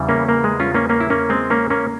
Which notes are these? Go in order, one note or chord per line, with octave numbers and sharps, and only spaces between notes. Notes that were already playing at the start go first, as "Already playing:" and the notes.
Already playing: E2 C#3 E3 G3
A#3 C#4
A#3
G#3
C#4 F4
A#3 C#4
A#3 C#4
E4
A#3 C#4
G#3 C4
A#3 C#4
A#3 C#4